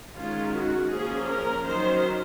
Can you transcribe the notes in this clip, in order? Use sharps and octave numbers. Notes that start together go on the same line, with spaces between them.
D#3 G#3 C#4 F4
F#4
F3 A#3 C#4 G#4
A#4
D#3 F#3 C#4 C5